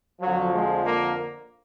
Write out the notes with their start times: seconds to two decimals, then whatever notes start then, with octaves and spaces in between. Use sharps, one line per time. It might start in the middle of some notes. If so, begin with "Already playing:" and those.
0.21 F2 D3 F3 F#3
0.53 G#3
0.85 A#3